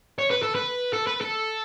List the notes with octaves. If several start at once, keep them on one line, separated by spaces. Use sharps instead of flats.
C#5
B4
A4
B4
A4
B4
A4